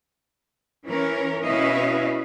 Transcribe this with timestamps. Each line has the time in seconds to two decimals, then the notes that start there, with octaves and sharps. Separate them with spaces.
0.85 E3 C#4 A#4
1.44 B2 C#4 E4 B4 D#5 F5